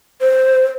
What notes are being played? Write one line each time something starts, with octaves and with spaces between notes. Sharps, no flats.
C5